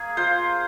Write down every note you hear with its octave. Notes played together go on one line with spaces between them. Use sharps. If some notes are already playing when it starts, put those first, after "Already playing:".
Already playing: A#3 G#4
F4 C5